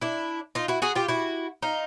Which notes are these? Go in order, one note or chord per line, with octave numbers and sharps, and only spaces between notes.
D4 E4
D#4 F4
E4 F#4
F#4 G#4
F4 G4
E4 F#4
D#4 F4